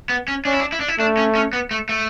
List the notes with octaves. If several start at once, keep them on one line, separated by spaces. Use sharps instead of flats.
B3
C#4
C#4 D4
E4
D4
E4
D4
E4
A3 D4
C#4
C#4
B3
A3
A3